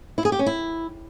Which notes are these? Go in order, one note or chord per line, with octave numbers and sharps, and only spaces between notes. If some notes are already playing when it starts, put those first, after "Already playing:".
E4
G#4
G4
C#4
E4